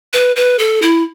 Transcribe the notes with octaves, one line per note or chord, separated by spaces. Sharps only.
B4
B4
A4
E4